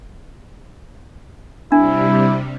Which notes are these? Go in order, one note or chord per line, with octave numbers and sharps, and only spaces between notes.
C3 G3 D4 E4